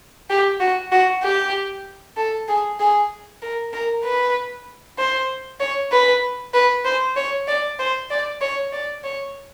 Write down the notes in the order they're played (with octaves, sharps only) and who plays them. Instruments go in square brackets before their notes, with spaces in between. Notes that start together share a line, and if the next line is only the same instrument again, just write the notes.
[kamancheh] G4
F#4
F#4
G4
A4
G#4
G#4
A#4
A#4
B4
C5
C#5
B4
B4
C5
C#5
D5
C5
D5
C#5
D5
C#5